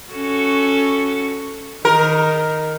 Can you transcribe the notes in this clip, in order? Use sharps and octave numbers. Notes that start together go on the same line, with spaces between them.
C#4 F#4 A4
D#3 A#4